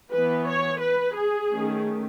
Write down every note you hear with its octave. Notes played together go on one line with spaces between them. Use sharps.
E3 B3 B4
C#5
B4
G#4
D#3 A3 C#4